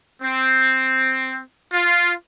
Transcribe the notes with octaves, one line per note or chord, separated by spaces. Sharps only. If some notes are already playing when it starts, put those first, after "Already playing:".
C4
F4